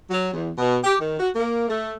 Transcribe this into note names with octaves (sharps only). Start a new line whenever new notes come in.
F#3
E2
B2
G4
D#3
F#4
A#3
A3